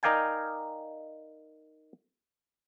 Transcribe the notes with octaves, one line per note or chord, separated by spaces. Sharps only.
D#4 A#4 D5 F5 G5 G#5